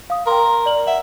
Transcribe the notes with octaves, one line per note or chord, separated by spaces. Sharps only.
F5 D#6
A#4 G5 A#5 C6
D5 F#7
E5 F#5